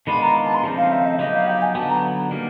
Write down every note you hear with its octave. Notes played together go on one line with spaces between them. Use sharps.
D#3 G#3 B3 D4 F4 B5
A#5
A5
C6
C#3 F3 A3 C4 D#4
F5
E5
D#5
F#3 B3 D#4 G4 D#5
F5
G5
G#5
D3 F#3 B3 A5
A#5
D#3 G3 A#3